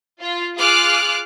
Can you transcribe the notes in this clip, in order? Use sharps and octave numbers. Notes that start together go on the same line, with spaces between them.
F4
F4 G#4 D6 F6 F#6